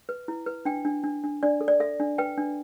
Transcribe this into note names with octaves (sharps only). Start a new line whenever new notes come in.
B4
E4
B4
D4 G5
D4
D4
D4
D4 D5
A4
D5
A4 E5
D4
B4 G5
D4